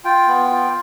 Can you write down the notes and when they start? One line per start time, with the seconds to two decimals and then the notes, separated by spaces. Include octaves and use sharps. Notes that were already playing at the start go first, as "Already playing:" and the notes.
0.04 F4 G5
0.28 B3
0.51 F4